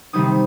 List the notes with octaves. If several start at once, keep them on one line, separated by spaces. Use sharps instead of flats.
C3 D#3 G3 D#4 D#6